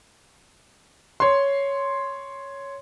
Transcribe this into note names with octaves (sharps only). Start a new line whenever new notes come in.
C#5 C6